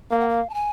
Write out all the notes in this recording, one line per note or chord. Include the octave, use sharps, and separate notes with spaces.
A#3 F5
F#5
F5
A5
G#5